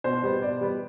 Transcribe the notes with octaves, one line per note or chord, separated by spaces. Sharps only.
B2 C5
G3 B3
B2 D5
G3 B3